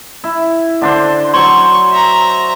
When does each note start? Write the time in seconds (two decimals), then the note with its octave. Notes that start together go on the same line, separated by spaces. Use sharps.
0.24 E4
0.81 D3 D4 C5
1.34 F#3 C5 C#5 C6 C#6
1.92 E5 A#5